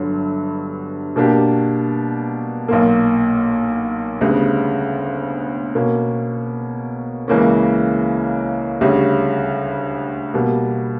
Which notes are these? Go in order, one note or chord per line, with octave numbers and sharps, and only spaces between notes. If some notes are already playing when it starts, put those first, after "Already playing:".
Already playing: G1 G2 D3 F#3
B2 A#3 D4 G4
B1 A#2 A#3
D2 C#3 G3 B3
B2 A#3 C#4
C#2 C#3 E3 A#3 C#4
D2 C#3 G3 C#4
B2 G3 A#3